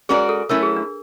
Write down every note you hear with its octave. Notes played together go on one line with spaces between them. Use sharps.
G#3 C#4 F#4 G#4 A#4 D5
A4
F#3 A3 C#4 E4 A#4
G#4
D4